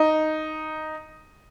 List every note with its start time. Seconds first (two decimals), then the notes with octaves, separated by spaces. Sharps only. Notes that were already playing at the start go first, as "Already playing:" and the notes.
Already playing: D#4